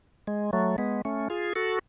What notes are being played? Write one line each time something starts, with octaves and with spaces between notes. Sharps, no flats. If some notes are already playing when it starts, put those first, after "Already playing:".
G#3
F#3 A3
G#3 B3
A3 C#4
F4 G#4
F#4 A4